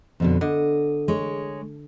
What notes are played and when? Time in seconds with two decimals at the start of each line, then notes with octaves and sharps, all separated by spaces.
0.20 F2 B2 D3
0.41 D3 D#5
1.08 G#3 C#5